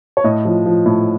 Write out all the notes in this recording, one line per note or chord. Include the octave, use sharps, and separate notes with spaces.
C#5
A2 D#5
F3
F3
A2